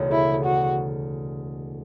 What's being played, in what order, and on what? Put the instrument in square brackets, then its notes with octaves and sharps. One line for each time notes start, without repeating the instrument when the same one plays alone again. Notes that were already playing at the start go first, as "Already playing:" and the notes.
Already playing: [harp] E1 D2 C#3
[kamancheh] E4
F#4